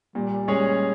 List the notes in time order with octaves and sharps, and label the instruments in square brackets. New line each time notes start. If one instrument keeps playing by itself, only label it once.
[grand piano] A#2 [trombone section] G3
[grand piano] G#3 C#4 G#4 C#5